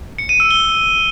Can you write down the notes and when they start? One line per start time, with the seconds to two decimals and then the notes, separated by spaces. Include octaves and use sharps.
0.18 C#7
0.29 D#7
0.40 E6
0.51 G7